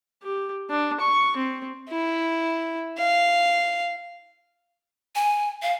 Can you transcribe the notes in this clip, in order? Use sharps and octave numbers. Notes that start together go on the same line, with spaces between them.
G4
D4
C#6
C4
E4
F5
G#5
F5